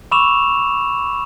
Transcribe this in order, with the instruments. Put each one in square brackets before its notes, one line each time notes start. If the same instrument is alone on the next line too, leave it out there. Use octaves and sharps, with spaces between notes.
[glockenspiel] B5 C#6 D6 E6 E7 F7